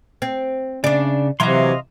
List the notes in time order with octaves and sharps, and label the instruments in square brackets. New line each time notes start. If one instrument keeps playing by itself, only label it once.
[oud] C4
[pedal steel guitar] C#3 [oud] D4 D5
[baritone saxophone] C3 [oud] E3 F#3 [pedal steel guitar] D#5 F5 C6